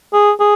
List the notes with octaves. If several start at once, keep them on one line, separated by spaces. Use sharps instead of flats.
G#4
G#4